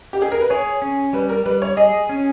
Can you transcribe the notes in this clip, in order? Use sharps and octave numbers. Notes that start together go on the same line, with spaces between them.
G4
G#4
A#4
B4
G#4 C#5
C#4
G3 B4
A#4
G3 B4
C#5
G#4 D#5
C#4